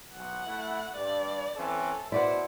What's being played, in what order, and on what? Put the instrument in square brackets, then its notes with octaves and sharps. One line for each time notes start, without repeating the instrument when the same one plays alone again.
[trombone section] B1 [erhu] F#5
[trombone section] A3 E4
[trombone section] G2 [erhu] D5
[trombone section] E3 C4 C#4 [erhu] A4
[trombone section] B2 [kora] E4 D5 F#5 [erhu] C5